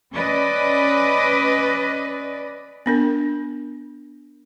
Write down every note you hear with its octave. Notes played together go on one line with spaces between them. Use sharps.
C#4 B4 D5 D#5
B3 D4 A#4